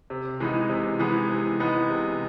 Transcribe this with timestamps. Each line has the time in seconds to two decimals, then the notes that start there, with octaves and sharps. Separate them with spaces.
0.10 C3
0.40 E3 G#3 B3 D#4
0.69 C3
0.99 E3 G#3 B3 D#4
1.30 C3
1.60 E3 G#3 B3 D#4
1.90 C3